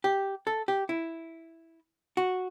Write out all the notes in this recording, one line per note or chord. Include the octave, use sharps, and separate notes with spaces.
G4
A4
G4
E4
F#4